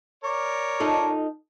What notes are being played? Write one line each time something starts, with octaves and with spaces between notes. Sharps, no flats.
A#4 C#5 D5
D#4 F4 A4